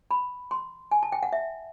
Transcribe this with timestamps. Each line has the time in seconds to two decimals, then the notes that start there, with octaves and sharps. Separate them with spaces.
0.11 B5
0.51 C6
0.91 G#5
1.03 A5
1.12 G5
1.23 F#5
1.33 E5